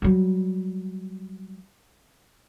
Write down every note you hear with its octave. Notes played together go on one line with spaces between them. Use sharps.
F#3 G3